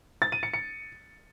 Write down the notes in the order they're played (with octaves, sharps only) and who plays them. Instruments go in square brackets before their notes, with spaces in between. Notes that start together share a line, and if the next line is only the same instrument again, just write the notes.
[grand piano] A6
D#7
C#7
C#7